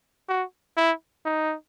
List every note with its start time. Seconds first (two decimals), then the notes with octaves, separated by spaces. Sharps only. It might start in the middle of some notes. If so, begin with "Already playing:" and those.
0.29 F#4
0.77 E4
1.25 D#4